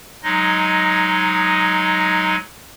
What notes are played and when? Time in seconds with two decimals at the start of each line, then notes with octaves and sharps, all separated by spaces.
0.23 F#3 G#3 D#4 D#5